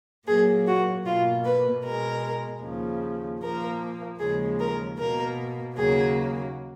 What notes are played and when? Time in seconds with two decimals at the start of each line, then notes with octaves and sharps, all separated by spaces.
0.27 A#2 F#3 A#3 G#4
0.66 F#4
1.05 B2 A#3 F4
1.44 B4
1.84 B2 G#3 A#4
2.62 D#2 C#3 F3
3.40 A#2 F3 A#3 A#4
4.19 D#2 C#3 F3 G#3 G#4
4.59 A#4
4.98 B2 A#3 A#4
5.76 D#2 C#3 F#3 A#3 G#4